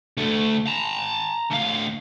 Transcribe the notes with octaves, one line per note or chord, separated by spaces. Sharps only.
D2 A3
A5 A#5
D2 F5